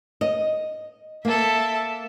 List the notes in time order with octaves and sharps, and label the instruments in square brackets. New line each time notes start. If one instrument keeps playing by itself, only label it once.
[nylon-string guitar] D#5
[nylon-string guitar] A#3 [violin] A4 E5